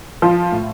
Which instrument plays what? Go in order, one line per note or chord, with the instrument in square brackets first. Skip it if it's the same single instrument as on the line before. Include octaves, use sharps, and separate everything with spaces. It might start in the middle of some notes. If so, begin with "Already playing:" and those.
[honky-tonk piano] F3 F4
A2